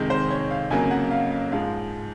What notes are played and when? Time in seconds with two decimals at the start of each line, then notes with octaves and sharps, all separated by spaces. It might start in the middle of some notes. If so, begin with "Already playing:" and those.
Already playing: F2 C3 D#3 G#3
0.10 C5
0.30 C#5
0.51 F5
0.70 F2 C#3 F#3 A#3 G#5
0.91 F#5
1.11 F5
1.31 F5
1.52 G#2 F3 G#3 F5